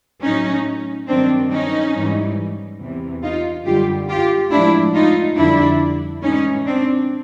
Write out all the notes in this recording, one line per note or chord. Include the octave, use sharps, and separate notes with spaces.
A2 F#3 A3 C#4 D#4
G2 D#3 F#3 C4 D4
C#4 D#4
G#2 E3 G3
E2 C3 E3
D#4 F4
F#2 D3 G3 F4 G4
F4 G4
A2 F3 G#3 D4 E4
D#4 F4
F2 D3 G3 D4 E4
A2 E3 G#3 C#4 D#4
C4 D4